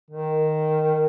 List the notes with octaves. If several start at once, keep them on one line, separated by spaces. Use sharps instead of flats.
D#3